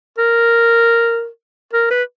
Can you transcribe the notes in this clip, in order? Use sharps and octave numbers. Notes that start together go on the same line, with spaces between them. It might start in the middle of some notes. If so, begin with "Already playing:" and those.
A#4
A#4
B4